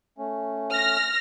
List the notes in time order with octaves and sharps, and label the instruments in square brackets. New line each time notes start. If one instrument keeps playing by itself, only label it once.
[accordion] A3 C#4
[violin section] F6 A#6